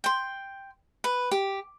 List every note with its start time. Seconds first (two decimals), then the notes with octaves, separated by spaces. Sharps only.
0.04 G5 C6
1.04 B4
1.31 G4